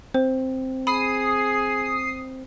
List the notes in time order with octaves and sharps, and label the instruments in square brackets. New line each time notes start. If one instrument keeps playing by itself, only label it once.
[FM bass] C4 [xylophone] C5
[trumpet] G#4 [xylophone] B5 [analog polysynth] D#6 C7